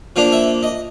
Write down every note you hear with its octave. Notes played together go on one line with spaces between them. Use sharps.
F3 A#3 D4 F5
E5
D#5